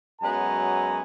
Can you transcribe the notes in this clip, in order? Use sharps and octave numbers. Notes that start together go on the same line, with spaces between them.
F#2 F#3 G#3 B3 G#5 A#5